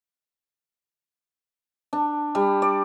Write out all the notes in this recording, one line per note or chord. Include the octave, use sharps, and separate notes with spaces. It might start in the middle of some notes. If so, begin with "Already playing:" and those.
D4
G3
D5